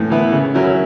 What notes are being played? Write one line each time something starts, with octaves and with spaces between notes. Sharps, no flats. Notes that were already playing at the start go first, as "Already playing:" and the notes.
Already playing: A2 E3 B3
E3 B3 E4
C#3
F#3 C#4 E4